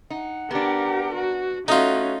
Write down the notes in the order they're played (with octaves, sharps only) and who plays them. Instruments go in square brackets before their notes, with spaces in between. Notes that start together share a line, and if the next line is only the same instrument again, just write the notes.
[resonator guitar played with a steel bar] D#4 [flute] F#5
[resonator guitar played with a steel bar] B3 D4 [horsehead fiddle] G4 A#4
[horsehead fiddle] F#4 [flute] F#5
[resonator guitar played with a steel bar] A3 [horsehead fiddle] C#4 [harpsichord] D#4 F4 [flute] F#4